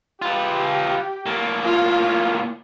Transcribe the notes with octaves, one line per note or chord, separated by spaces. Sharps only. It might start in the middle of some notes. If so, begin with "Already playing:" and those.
F4 G4 B4
A2 A#3
F4